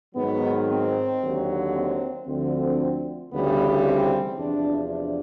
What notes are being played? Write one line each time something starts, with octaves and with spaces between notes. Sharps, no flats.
G#2 D#3 F#3 B3
C4
D#2 D3 F#3
C4
D2 D3 F3 C4
D2 C#3 E3 G3 B3
C4
E2 C3 F3 D4
D4